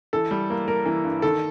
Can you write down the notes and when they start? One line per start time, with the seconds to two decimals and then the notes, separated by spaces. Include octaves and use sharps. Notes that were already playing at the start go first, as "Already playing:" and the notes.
0.13 E3 A4
0.31 G3
0.50 A#3
0.68 A#3 A#4
0.86 E3
1.04 G2
1.22 D#3 A4